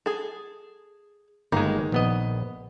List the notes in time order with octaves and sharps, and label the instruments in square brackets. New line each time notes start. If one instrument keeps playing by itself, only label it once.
[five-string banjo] G#4 A4
[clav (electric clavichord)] G1 G#3 [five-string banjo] D#3 A#3
[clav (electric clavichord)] A#1 B3 D#5